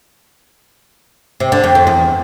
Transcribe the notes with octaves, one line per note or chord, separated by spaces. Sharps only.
C3
D3
F2
F2
E2